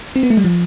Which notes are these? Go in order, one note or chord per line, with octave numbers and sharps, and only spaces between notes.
C4
B3
A3
G3
F3